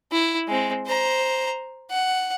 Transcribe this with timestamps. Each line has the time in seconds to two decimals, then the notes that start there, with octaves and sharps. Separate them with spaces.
0.12 E4
0.48 G#3 C4
0.86 C5 A#5
1.90 F#5